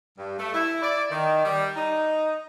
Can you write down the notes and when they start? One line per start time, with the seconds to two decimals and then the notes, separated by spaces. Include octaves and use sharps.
0.18 G2
0.38 A3
0.54 E4
0.82 D5
1.10 D#3
1.45 G3
1.76 D#4